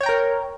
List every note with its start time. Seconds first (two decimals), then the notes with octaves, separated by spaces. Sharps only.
0.01 C#5
0.03 G5
0.06 A#5
0.09 A#4